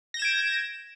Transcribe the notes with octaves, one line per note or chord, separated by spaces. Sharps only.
G6 G#6 A#6 D7 E7